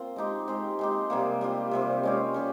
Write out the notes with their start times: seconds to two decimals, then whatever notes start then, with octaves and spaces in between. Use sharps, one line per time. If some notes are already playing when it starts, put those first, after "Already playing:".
Already playing: A#3 C4 F4
0.16 G#3 D#4 G4
0.47 G#3 C4 G4
0.79 G#3 D#4 G4
1.10 C3 G3 A#3
1.41 G3 C4 F4
1.71 C3 G3 C4
2.03 G#3 C#4 G4
2.34 G3 C#4 G4